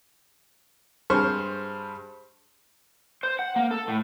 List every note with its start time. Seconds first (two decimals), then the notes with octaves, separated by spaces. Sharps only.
1.10 G2 G#3 C5 C#6 F6
3.23 C5
3.39 F#5
3.56 A#3
3.71 A4
3.88 A2